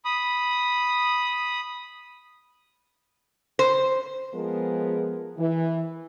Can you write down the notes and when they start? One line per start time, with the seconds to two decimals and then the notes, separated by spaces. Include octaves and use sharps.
0.05 B5 D#6
3.59 C5
4.34 F3 G#3 B3 G#4 A#4
5.38 E3